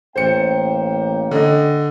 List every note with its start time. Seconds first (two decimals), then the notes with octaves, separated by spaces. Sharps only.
0.16 A1 A#3 C5 G5 C#7
1.31 D3 D#5